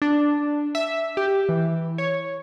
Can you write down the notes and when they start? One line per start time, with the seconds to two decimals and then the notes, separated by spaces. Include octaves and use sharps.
0.02 D4
0.75 E5
1.17 G4
1.49 E3
1.98 C#5